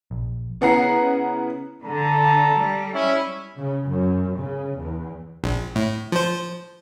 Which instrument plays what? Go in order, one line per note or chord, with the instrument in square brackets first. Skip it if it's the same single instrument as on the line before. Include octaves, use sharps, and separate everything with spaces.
[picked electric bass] A#1
[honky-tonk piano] C#3 B3 E4 F#5 A#5 C7
[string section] D3 [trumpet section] A4 A5 A#5
[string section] G3
[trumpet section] C#4 E4
[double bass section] C#3
F#2
C#3
E2
[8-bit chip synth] A#1
A2
F3 C5